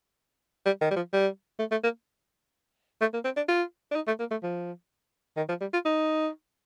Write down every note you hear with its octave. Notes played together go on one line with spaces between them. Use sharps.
G3
D#3
G3
F3
G3
A3
A3
A#3
A3
A#3
C4
D4
F4
D4
D#4
A3
A#3
A3
F3
D#3
F3
G3
F4
D#4